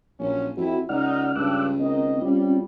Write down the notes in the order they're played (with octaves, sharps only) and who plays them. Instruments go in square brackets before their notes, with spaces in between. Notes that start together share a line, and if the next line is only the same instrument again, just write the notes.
[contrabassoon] A#1 [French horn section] A#2 F#3 C#4
[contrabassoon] F2 [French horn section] C4 E4 [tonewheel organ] F#4
[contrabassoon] C#2 [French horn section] D#4 [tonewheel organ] D5 F#5 F6
[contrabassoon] C#2 [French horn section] G2 D4 [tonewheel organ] D6 E6 F#6
[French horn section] D#3 A#4 D#5 [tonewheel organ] C4
[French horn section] G3 [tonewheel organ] C4 C#4 F4